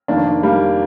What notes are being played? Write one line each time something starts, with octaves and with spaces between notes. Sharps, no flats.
F1 F2 D#3 A#3 D4
G3 A#3